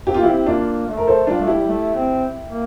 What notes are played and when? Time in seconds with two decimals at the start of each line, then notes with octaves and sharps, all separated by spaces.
0.06 C4 G4
0.14 A#3 F4
0.23 C4 E4 G4
0.46 A#3 D4 F4
0.88 A3
0.97 A#4
1.07 A4 C5
1.27 G3 D4 F4
1.40 A3
1.47 E4 G4
1.53 G3
1.68 A3
1.95 C4
2.49 A#3